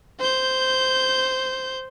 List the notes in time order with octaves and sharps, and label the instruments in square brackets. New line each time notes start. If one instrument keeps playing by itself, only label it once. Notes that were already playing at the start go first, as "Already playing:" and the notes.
[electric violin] C5 G6